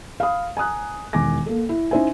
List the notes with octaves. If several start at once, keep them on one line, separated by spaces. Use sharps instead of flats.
F5 B5 D#6
G#5 A#5 D#6 F#6
E1 D#3 G#5 D6 A#6
A#3 A4
E4
C#4 D#4 E4 C5 E5 G#5